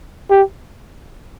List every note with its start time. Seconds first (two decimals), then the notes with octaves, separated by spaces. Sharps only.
0.30 G4